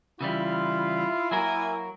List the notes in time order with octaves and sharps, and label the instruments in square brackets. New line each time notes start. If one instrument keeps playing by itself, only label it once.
[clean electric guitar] C#3 E3 G3 [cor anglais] E4 [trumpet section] F4
[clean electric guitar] F#3 F#4 A#4 [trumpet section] A#3 G#5